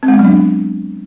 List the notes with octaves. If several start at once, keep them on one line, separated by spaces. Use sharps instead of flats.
C4
G#3
B3
F#3
D4